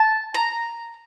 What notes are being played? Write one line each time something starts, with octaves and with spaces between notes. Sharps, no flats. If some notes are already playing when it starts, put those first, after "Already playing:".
Already playing: A5
A#5